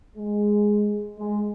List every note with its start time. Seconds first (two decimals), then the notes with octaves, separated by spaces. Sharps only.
0.17 G#3
1.19 G#3